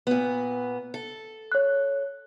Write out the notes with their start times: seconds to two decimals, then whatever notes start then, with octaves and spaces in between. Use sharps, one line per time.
0.07 A#2 B3
0.94 A4
1.52 C#5 F#6